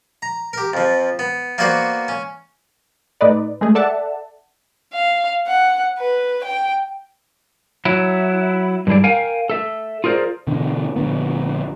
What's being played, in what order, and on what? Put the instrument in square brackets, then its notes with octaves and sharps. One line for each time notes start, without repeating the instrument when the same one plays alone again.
[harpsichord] A#5
G4 A#4
F2 F3
B3
A#3 B3 F#4 C5 D5 F#5
C#4
[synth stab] A2 D#4 B4 D5
G#3 A3 G#4
A4 D5 E5 F#5 A5
[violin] F5
F#5
B4
G5
[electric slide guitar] F#3 E4
G2 G3 E4 G#4 D5
A#4 F5 G5 G#5
A4 E5
F4 G#4 A#4 C5 D5
[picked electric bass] B2 D3 E3
A#1 D3 B3